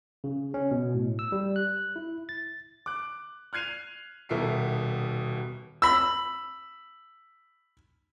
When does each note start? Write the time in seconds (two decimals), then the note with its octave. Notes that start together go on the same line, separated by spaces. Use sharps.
0.24 C#3
0.54 C#4
0.71 B2
0.95 A2
1.19 E6
1.32 G3
1.56 F#6
1.96 E4
2.29 A6
2.86 D6 F#6
3.53 F6 F#6 G#6 C7 D#7 F7
4.29 D#1 B2 A#4 E5 C7
5.82 B5 E6